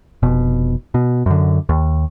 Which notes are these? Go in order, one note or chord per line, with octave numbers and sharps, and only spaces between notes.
F1 B2
B2
F#2 D3
D#2